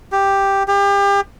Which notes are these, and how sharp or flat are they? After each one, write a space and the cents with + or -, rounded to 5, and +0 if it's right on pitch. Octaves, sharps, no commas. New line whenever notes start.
G4 +5
G4 +35